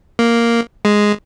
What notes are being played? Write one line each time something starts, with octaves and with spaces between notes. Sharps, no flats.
A#3
G#3